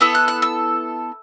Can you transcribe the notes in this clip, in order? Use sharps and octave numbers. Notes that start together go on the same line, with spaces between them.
B3 E4 A4 E6
F#6
F#6
E6